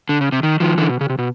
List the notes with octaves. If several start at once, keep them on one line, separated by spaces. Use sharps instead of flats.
D3
C#3
C3
D#3
D#3 F3
D3 E3
B2
C#3
C3
B2